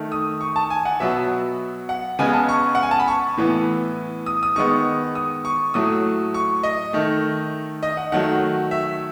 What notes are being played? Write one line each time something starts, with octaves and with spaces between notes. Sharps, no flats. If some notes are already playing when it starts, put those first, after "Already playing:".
Already playing: D#3 A3
D#6
C#6
A5
G#5
F#5
B2 F#3 B3 E5
F#5
C#3 G#3 B3 G#5
A5
C#6
F#5
G#5
A5
B5
C#6
A2 E3 B3
D#6
D#6
D#3 G#3 B3 C#6
D#6
C#6
A2 F#3 A3 D#6
C#6
D#5
D#3 A3
D#5
F#5
D#3 F#3 A3 F#5
E5